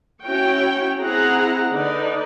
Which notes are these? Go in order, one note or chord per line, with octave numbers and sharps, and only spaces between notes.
C#4 E4 F#4 C#5 G5
C4 E4 G#4 F#5 A#5
D3 D#4 B4 D5